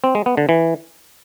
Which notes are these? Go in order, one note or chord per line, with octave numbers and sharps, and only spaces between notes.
C4
G#3
B3
D3
E3